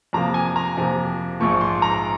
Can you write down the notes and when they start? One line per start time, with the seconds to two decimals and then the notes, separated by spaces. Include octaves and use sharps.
0.13 F2 C3 F3 A#3 A#5
0.34 G#5
0.56 A#5
0.77 F2 C3 F3 A#3
1.40 A#1 G#2 F3 C#6
1.61 C6
1.82 A#5